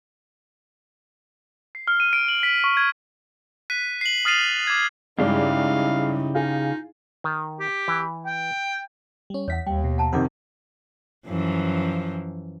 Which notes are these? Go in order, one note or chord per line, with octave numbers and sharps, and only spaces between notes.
C7
F6
D#7
D7
F#7
B6
C#6
G#6
F#6 B6 D#7
C7 F#7
D#6 F6 A6 C7 D#7 F7
D6 G#6
G2 C#3 G#3 D#4 E4 G4 D5 F5
D#4 F4 G#4
D#3
G4
E3
G5
G3 C#4
E2 C#5 E5 F#5 B6
D#2 G3 G5
B2
F#5 A5 A#5
F2 C3 D#3 G4 C5 F#5 D6
F#2 E3 F3